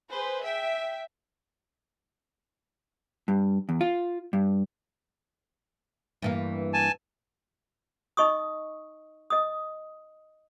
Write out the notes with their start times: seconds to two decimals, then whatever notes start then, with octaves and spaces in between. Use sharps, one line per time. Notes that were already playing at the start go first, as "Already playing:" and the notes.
0.11 G#4 B4 C5
0.42 E5 G5
3.28 G2
3.69 E2
3.81 F4
4.33 G2
6.22 G2 E3 A#3
6.73 G#5 A5
8.17 D#4 D#5 C#6 D#6
9.30 D#5 D#6